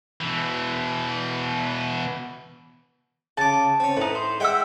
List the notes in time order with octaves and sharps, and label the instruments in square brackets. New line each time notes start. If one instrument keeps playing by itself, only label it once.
[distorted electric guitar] B2 E3
[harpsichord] C#3 D6 [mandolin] A5
[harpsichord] C4 C#4
[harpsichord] A2 [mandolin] D#4 B4
[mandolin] C5
[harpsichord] G#3 E5 F#5 [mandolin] G5 E6